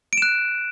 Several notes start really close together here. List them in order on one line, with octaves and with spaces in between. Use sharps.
D7 E7 F#6